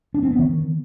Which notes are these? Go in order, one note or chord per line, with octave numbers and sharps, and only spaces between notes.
D4
C4
B3
D#3